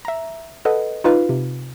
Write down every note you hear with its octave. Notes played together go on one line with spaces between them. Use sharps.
E5 A#5
A4 B4 D#5 F#5
D#4 F4 B4 F5
C3